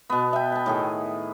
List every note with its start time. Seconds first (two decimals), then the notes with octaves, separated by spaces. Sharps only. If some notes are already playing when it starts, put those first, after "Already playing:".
0.10 B2 B3
0.33 E5 G5
0.52 E5 A5
0.66 A2 D#3 G#4